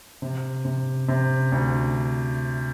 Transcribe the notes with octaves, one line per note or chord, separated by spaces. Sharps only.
C3
C3
C3
D2